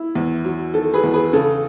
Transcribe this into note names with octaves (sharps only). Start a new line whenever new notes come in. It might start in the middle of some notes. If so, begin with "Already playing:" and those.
Already playing: E4
E2
F#3
D#3 A4
G#4 B4
E2
G#4 B4
C#3 A4